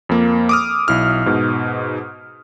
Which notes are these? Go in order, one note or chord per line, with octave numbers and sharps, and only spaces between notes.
F2 A#3
D6 D#6 F6
B1 E4 F6
G#2 B2